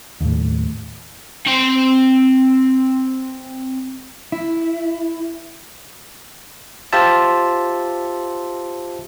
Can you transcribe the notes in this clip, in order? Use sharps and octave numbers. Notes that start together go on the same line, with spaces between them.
D#2 A2
C4 C6
E4
F4 G4 C5 E5 A5